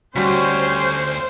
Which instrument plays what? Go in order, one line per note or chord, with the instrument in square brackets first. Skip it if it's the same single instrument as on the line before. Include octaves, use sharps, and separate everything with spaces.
[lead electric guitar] D2 [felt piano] G3 F#4 B6 [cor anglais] C#4 [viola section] C5